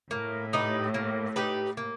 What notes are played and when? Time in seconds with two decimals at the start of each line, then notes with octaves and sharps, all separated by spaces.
0.11 A2 A#3
0.53 D#4 G4 B4
0.94 A#3
1.36 D#4 G4 B4
1.77 A#3